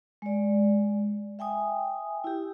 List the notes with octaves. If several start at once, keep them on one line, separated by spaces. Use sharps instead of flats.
G#3 D5
E5 G5 G#5 D#6
E4 G4